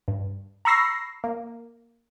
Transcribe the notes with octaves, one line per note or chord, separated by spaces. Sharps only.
G2
A#5 B5 C#6 E6 A#6 C7
A#3